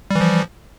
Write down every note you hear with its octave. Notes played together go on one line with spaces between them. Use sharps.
E3 F3 G3